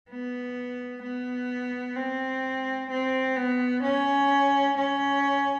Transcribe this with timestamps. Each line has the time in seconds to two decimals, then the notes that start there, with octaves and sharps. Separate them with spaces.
0.10 B3
1.02 B3
1.96 C4
2.90 C4
3.36 B3
3.83 C#4
4.77 C#4